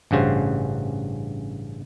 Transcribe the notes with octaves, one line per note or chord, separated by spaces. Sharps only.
A1 G2 C#3 F#4 C5